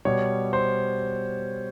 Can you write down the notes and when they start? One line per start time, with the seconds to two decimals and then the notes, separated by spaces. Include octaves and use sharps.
0.05 B2 G3 C#5
0.53 C5